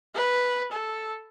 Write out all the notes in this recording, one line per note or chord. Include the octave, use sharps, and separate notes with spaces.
B4
A4